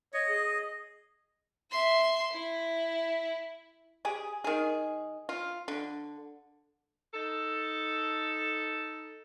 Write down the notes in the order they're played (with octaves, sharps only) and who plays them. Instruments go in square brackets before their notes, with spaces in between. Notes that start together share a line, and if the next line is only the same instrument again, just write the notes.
[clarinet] C#5 [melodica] D#5
[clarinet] G#4
[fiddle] E5 C6
E4
[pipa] G4 G#4
D#3 G#4
F4
D3
[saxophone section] D#4 A4